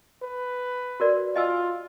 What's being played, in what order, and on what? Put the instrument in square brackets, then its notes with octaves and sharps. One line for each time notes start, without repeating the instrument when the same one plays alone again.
[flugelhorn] B4
[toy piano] F#4 A#4 D5
[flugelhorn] F4 [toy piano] D#5 G#5 E6